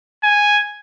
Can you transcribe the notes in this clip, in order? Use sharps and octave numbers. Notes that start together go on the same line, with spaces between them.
G#5